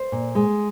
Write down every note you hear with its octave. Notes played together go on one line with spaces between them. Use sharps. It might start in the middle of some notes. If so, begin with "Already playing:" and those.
Already playing: C5
A#2
G#3